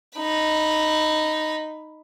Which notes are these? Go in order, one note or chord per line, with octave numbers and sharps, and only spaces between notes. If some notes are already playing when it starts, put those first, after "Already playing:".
D#4 B5